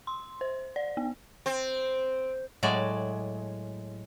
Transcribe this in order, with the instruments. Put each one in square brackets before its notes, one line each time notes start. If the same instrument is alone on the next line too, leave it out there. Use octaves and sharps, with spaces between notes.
[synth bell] C6
C5
D5
B3
[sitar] C4
[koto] A2 F#3 G#3 D5